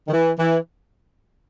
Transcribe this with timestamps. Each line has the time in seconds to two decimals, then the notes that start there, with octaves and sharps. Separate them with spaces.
0.07 D#3
0.12 E3
0.38 E3